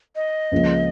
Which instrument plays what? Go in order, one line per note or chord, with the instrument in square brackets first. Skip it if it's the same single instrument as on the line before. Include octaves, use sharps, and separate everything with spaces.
[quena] D#5
[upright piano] C#2 C#3 F3 A#3 C#4